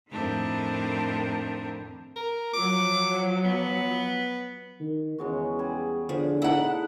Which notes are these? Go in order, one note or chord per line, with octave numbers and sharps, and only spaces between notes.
F2 A2 D#3 C4 D4 A#4
A#4
F3 F#3 D6
B3
D#3
E2 C#3 G#3 F#4
G3 G#4
D3 F3 F#5
B2 D#4 E4 F#5 A5